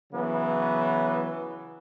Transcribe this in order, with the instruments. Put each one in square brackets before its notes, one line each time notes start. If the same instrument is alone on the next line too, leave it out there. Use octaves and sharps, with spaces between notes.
[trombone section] C#3 E3 F#3 B3